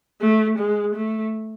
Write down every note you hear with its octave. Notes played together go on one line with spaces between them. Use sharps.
A3
G#3
A3